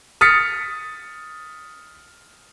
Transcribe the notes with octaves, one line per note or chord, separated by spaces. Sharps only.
D#6 F6 A6 B6 C#7